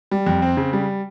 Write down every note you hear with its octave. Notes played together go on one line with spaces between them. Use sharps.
G3
F2
C4
C#3
G3